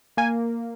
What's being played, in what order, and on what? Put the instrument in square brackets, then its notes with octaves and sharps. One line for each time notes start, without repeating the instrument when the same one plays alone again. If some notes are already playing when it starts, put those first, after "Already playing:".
[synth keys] A#3 G#5